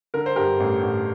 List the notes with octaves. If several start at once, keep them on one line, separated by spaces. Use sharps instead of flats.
D3 A#4
C5
G2 G4 A#4
A1
A1